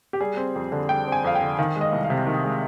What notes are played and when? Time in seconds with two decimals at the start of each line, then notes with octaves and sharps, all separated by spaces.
0.13 G4
0.20 G3 G#4
0.37 C4
0.55 F2
0.72 D3
0.89 G3 G5
1.07 C4
1.12 G#5
1.24 F2 F5
1.35 G5
1.41 D3
1.58 D#3 F5
1.76 G#3
1.81 D#5
1.93 C2
2.04 F5
2.10 C3
2.27 D#3
2.45 G#3